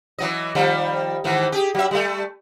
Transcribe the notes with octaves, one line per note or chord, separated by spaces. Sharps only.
E3 F#3 D#5
D#3 F3 G3
G#2 D#3 E3
G4 G#4
F#3 E5
G3 A3